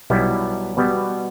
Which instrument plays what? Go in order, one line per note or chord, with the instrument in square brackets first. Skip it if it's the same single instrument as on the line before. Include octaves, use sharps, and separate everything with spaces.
[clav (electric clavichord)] B1 B2 G3 B3 E4
B2 G3 B3